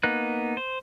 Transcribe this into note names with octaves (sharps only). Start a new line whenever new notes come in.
A#3 B3 D#4 F#6
C5